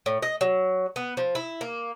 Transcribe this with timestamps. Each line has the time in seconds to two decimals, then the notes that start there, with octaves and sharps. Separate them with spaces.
0.06 A2
0.22 D#5
0.41 F#3
0.96 B3
1.17 F3
1.35 E4
1.61 A#3